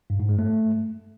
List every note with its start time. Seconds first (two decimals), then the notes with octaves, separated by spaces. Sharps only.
0.10 G2
0.19 G#2
0.29 G#3
0.39 A3